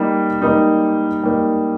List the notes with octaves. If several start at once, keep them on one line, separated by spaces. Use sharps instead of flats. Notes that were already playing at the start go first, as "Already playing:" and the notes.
Already playing: G3 A#3 D#4
G3 A#3 D#4
G3 A#3 D#4